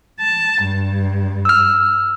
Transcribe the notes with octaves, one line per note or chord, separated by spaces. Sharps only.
A5
G2
E6 F6